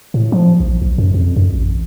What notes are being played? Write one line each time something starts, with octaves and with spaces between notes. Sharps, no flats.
A2
F3
A#1
B1
F#2
F2
F#2
A1